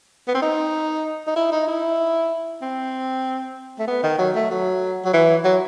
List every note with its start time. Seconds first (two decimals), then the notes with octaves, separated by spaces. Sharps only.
0.28 B3
0.35 C4
0.42 D#4
1.27 D#4
1.36 E4
1.52 D#4
1.68 E4
2.62 C4
3.79 A3
3.87 B3
4.03 D#3
4.19 F#3
4.35 A3
4.50 F#3
5.05 F#3
5.14 E3
5.44 F#3